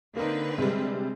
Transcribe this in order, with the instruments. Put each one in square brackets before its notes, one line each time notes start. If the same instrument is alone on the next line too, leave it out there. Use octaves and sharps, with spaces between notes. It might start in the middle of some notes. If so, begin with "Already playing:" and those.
[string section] D3 C4 B4 [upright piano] A#3 D#4
[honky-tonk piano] C3 G3 [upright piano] G#3